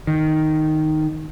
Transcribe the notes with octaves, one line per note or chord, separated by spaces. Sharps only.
D#3